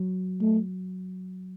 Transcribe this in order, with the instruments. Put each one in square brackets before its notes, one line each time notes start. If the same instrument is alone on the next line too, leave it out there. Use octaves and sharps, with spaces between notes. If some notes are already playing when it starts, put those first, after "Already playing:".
Already playing: [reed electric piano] F#3
[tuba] A3